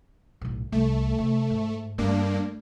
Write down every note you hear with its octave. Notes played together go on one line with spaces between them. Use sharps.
B1 A2
C2 A3
C3
G#2
G2 A3 A#3 D4